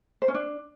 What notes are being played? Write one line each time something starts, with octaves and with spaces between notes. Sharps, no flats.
C5
C#4
D4